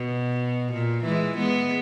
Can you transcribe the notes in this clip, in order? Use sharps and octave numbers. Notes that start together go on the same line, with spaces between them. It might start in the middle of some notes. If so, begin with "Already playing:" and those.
Already playing: B2
A#2
E3 G#3
G#3 B3